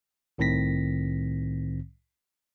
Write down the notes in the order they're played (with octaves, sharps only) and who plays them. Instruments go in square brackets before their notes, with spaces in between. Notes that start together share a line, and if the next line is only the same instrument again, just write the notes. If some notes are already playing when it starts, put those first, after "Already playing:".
[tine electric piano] C2 A2 D#3 C4 A#6 B6